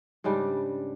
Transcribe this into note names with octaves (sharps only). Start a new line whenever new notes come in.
G#2 C#3 G3 D4